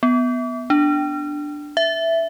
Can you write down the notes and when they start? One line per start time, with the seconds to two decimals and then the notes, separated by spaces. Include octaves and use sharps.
0.03 B3
0.70 D4
1.77 E5